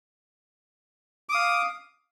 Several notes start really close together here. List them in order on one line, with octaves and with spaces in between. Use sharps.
D6 D#6 F5